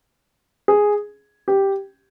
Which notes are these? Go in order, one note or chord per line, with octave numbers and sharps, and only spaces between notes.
G#4
G4